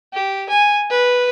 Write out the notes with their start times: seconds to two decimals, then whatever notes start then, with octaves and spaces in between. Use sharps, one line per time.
0.14 G4
0.49 G#5
0.90 B4